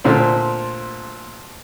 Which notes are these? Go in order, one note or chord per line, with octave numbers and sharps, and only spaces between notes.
A#2 D3 A3 C4